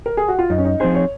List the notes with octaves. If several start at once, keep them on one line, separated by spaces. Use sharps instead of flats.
A#4
G#4
F#4
F4
F#2 D#4
C#4
D#4
F3 C4 D#4 G#4 C5
C#5